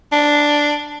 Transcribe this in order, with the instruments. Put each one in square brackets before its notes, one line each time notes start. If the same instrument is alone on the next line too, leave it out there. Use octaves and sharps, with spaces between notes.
[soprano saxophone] D4